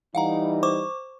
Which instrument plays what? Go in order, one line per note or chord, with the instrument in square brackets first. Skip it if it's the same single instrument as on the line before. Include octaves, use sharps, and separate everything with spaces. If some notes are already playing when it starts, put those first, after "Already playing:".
[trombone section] E3 G3 D#4 [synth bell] F5 F#5 A#5
[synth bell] C5 C#6 D6